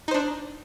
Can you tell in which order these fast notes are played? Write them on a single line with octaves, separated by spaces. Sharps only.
D#4 C5 D4